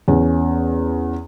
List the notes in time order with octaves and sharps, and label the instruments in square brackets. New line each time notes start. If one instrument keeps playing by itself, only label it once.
[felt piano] E2 C#4